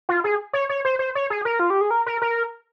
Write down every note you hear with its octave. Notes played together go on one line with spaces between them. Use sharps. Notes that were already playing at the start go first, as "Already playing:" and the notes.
F4
G#4
C#5
C#5
C5
C5
C#5
G#4
A#4
F4
G4
G#4
A#4
A#4
A#4